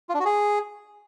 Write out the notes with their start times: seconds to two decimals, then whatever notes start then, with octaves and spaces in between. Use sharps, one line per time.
0.09 F4
0.15 D4
0.20 F#4
0.25 G#4